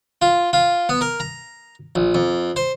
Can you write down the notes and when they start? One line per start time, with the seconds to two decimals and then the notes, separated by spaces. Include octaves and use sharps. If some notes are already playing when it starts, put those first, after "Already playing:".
0.22 F4
0.53 F4
0.89 B3
1.01 A#4
1.20 A#5
1.95 A#1
2.15 F2
2.56 C5